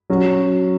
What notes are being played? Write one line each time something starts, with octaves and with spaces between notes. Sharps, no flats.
F#3 C#4 F#4